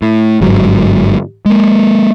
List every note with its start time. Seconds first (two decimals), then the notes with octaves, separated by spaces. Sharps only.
0.02 A2
0.41 G1 G#2 F#3
1.46 G#3 A#3